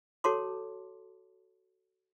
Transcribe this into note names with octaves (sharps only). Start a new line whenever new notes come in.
F#4 A4 C#5 A5 C6 D6